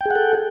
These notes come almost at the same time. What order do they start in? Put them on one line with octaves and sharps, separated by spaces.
G5 G#4 F#5 A4